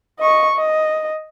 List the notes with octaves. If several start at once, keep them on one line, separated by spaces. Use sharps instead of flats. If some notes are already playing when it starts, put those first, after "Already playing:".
D#5 C#6
D#5